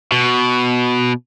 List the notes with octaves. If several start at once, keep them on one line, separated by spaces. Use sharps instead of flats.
B2